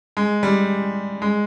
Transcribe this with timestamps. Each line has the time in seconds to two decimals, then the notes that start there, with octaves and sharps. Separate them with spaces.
0.17 G#3
0.43 G3
1.22 G#3